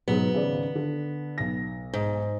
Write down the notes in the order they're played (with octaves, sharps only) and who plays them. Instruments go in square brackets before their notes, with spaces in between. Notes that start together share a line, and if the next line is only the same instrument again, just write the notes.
[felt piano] G#2 B2 F#3 [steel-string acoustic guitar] B3
[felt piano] G#1 C#3 D5
D3
B1 A#6
[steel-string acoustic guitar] G#2